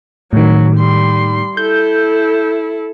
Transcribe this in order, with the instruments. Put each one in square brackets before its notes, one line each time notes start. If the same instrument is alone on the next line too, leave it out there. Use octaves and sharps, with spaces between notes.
[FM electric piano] A2 D#3 [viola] F#3
[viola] G3 C6
[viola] E4 A4 [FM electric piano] G6